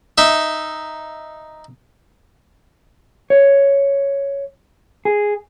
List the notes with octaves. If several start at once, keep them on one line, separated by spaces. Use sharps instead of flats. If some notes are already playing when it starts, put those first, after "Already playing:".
D#4 E5
C#5
G#4